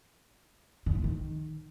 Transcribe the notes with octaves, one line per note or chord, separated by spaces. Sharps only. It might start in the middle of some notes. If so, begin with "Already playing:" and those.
D3
C3
D#3